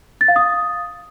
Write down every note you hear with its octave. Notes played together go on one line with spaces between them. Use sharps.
A6
F5
D#6